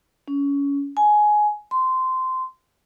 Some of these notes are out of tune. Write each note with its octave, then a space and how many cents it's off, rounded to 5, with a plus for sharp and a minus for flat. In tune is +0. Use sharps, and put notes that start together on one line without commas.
C#4 +25
G#5 +15
C6 -15